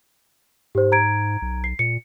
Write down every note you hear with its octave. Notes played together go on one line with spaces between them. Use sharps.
G#2 G4 C5
A#5 G#6 D7
B1
C7
A#2 C#7